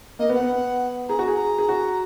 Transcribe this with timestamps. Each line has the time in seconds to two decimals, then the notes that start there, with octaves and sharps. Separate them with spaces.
0.19 A#3 D#5
0.29 B3
0.34 F#5
0.40 B3
1.09 G#4 A#5
1.19 F#4
1.28 G#4
1.37 A#5
1.59 G#4
1.69 F#4